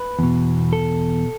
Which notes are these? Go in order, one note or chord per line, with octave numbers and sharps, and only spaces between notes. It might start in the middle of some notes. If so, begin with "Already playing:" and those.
Already playing: B4
E2 B2
A4